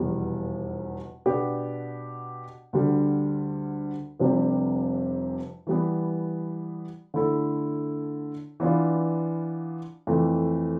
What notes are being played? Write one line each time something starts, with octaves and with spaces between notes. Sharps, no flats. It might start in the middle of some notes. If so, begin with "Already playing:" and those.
Already playing: F1 E2 B2 G3
B2 B3 D4 G4
D2 D3 G3
F1 F2 C3 G3 D4
E3 G3 B3
D3 A3 E4 A4
E3 B3 D4 F4
F2 E3 A3